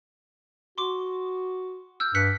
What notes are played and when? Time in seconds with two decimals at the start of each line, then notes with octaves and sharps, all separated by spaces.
0.78 F#4 C6 D6
2.00 E6 F6 G6
2.15 G2 F#6 B6 C#7